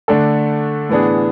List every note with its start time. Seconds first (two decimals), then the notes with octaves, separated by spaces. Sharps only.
0.08 D3 A3 D4 A4
0.89 A2 E3 B3 D4 G#4